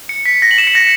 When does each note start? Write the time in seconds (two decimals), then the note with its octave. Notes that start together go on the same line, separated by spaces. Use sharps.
0.09 C#7
0.26 B6
0.42 A#6
0.51 F#7
0.58 E7
0.67 C#7
0.75 A#6